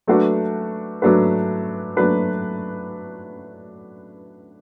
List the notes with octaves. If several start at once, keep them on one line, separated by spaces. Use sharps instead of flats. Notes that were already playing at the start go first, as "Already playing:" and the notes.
F#3 A3 D4 F#4 B4
F#3 A3 D4 F#4 B4
F#3 A3 D4 F#4 B4